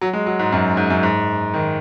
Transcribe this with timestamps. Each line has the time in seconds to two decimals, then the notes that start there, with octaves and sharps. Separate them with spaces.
0.01 F#3
0.13 G#3
0.26 F#3
0.39 G#2
0.52 F#2
0.77 G#2
0.90 F#2
1.03 G#2
1.54 D#3